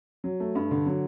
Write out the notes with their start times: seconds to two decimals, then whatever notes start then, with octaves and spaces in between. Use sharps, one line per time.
0.24 F#3
0.40 A3
0.55 G2
0.71 D3
0.86 F#3